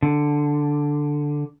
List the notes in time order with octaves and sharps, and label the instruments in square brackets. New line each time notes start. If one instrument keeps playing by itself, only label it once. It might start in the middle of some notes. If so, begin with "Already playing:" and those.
[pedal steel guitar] D3